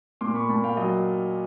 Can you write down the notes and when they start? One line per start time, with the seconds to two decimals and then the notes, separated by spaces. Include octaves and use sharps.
0.21 A#2 C6 D6
0.35 B5 C#6
0.49 A#2 A5 B5
0.64 F5 G5
0.77 F#3 D#5